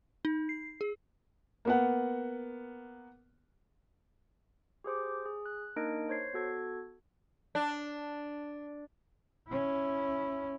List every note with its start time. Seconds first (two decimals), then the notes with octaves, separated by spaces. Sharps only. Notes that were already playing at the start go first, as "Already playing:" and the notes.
0.25 D#4
0.49 C7
0.81 G#4
1.65 A#3 B3 F#5
4.84 G4 G#4 C5 D6
5.26 G#4
5.46 F#6
5.76 A#3 D4 D#4 A#4 D#5 D7
6.09 C5 C#5 G#6 C7
6.33 B3 F#4 A4 G#6
7.55 D4
9.49 C#4 E4